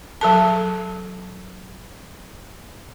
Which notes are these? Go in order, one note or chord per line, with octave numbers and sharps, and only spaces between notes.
F#3 A4 A5